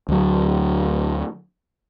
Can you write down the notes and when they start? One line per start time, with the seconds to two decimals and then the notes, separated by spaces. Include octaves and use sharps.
0.08 D2 F#3